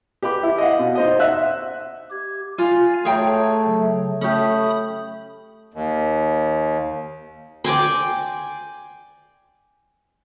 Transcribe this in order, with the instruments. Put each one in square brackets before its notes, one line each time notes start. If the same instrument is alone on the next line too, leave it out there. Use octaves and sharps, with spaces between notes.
[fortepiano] G4 B4 B5 D6
E4
D#5 F5 F#5
B2
D#4 C5 D#5
E5 F#5 E6 F#6
[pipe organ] G4 G#6
[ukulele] F4 [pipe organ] F5 G#5 A6
[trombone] A3 [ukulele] G#4 G5 A#5 [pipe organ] C#5
[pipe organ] C#3 F#3
[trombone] A3 [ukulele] C#4 G4 [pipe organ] B5 D#6
[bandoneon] D#2
[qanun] D5 G5 G#5 C6